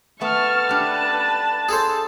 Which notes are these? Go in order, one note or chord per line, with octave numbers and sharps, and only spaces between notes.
A3 B3 A5 C#6 F6
D4 G4 B4
G#4 A4 C5